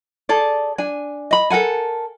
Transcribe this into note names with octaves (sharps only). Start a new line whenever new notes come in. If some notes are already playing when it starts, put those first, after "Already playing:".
G#4 A4 D5
D4 G#5
D#5 B5
A4 A#4 F#5 G#5